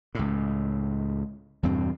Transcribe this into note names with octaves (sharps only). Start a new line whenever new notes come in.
C#2 A2
E2 G2 B2 C4